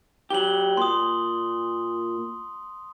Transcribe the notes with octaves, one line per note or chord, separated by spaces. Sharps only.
F#3 G4 F#7 G7
A#2 C6 D#6